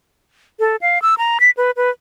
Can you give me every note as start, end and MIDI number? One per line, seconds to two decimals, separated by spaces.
0.60 0.76 69
0.81 1.01 77
1.02 1.15 88
1.18 1.38 82
1.40 1.50 95
1.57 1.71 71
1.77 1.90 71